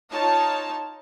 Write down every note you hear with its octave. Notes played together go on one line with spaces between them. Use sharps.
D#4 F4 C#5 A5